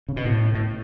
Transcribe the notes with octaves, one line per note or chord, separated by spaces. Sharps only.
C#3
B2
A2
A2